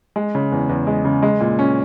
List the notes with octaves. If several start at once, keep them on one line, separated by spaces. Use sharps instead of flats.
G#3
C#3
E2
E2
G#3
C#3
G#3
A#2
C#4